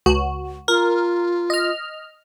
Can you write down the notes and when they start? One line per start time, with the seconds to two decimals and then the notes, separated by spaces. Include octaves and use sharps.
0.06 C#2 F#4
0.68 F4 A#4
1.50 D#5 F6